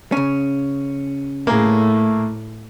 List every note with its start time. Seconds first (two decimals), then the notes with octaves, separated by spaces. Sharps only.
0.12 C#3 C#4
1.47 A2 A3 A#3 G#4